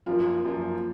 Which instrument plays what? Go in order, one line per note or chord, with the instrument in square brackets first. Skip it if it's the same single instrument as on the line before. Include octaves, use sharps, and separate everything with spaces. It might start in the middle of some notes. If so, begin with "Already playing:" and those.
[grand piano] F#2 F3 A#3 [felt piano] F4
[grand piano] F#2 F3 A#3